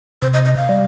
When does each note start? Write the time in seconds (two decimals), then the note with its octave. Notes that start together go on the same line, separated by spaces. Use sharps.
0.22 C3 C5
0.34 D#5
0.45 D#5
0.57 F5
0.69 G3